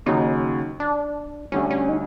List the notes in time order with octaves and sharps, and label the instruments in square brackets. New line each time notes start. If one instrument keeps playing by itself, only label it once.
[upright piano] D#2 C#3 F#3 [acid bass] D#4
[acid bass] D4
[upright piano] D2 D3 G3 [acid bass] C#4
[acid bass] C#4
D#4